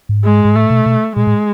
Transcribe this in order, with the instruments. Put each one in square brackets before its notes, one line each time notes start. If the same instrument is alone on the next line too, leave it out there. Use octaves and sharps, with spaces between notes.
[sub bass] G#2
[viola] G#3
[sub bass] G#2
[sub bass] A2 [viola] A3
[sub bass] B2
B2
[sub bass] A#2 [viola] G#3
[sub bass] A2